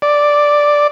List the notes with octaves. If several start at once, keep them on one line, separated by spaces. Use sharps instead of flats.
D5